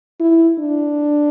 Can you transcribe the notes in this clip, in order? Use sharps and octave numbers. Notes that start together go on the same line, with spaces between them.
E4
D4